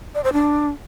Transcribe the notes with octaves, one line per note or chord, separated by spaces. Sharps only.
D5
C5
D4